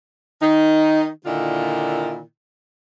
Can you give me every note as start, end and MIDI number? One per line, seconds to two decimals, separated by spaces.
0.41 1.08 51
0.41 1.08 63
1.26 2.21 46
1.26 2.21 50
1.26 2.21 51
1.26 2.21 64
1.26 2.21 65